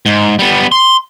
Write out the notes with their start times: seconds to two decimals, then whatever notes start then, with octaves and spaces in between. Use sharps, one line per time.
0.06 G#2
0.39 G3 B3
0.72 C6